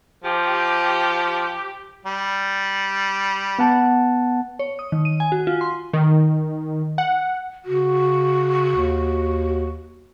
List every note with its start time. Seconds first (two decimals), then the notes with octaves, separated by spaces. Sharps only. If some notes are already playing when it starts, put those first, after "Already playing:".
0.24 F3 G4
2.06 G3
3.59 B3 F#5 A5
4.59 C#5
4.79 D#6
4.92 D#3
5.05 D#7
5.20 G#5
5.32 F#4
5.47 F4
5.61 C6
5.93 D#3
6.98 F#5
7.65 C#3 F#4
8.76 D#2